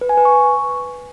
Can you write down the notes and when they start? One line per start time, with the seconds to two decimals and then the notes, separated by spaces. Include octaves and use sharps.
0.01 B4
0.09 G#5
0.17 B4
0.25 C#6